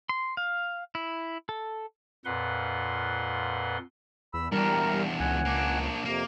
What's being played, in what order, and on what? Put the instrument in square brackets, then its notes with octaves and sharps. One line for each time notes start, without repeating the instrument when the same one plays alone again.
[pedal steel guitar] C6
F5
E4
A4
[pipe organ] F2 A#2 B4 F#5 C6
[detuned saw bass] E2 [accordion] B5 E6
[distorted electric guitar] E2 D4 [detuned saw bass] G3 [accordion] A#4 A#5
[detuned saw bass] C#2 [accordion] F#5 G#5
[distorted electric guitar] A#3 D4
[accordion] F2 C3 [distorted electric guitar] A#3